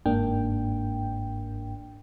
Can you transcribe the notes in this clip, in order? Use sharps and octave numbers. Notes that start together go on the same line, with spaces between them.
G1 G#2 A#3 D4 G5